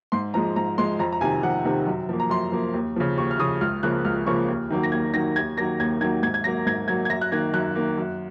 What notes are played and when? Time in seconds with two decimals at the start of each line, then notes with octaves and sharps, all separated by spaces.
0.12 G#2 C6
0.34 F3 G#3 A#5
0.56 G#2 A#5
0.78 F3 G#3 C6
0.99 F2 A#5
1.12 A#5
1.21 C3 D#3 G#5
1.43 F2 F#5
1.65 C3 D#3
1.87 F#2
2.09 F3 A#3
2.20 A#5
2.30 F#2 C6
2.52 F3 A#3
2.74 D#2
2.96 C#3 F3
3.17 D#2 C#6
3.31 F6
3.39 C#3 F3 D#6
3.61 C#2 F6
3.83 C#3 F3 A#3 F#6
4.05 C#2 F6
4.27 C#3 F3 A#3 C#6
4.48 D#2
4.71 D#3 F#3 A#3
4.83 A#6
4.92 D#2 G#6
5.14 D#3 F#3 A#3 A#6
5.36 D#2 G#6
5.57 D#3 F#3 A#3 A#6
5.80 D#2 G#6
6.01 D#3 F#3 A#3 G#6
6.23 G#2 G#6
6.34 G#6
6.44 F#3 A#3 A#6
6.66 G#2 G#6
6.88 F#3 A#3 G#6
7.05 G#6
7.10 F#2 A#6
7.21 F#6
7.32 D#3 A#3 G#6
7.54 F#2 F#6
7.75 D#3 A#3
7.97 F#2